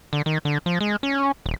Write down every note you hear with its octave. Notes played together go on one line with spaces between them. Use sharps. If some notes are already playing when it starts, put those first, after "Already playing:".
D3
D#3
D3
F3
G#3
C#4
D#1